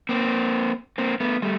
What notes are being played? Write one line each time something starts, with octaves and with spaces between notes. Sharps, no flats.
A#3 C4
A#3 C4
A3 B3
G3 A3